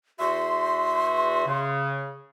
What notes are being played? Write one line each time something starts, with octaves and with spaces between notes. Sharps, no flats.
E2 F#4 E5 C6
C#3